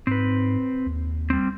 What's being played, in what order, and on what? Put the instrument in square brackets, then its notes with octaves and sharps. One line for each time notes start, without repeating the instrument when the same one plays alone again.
[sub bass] G#2 [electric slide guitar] C4 B4
[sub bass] D#2
[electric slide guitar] G3 C4